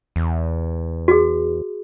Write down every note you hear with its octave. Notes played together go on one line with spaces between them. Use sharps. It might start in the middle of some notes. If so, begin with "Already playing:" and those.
E2
F#4 G#4